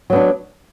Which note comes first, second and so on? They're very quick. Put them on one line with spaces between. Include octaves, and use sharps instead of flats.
F#3 B3 D4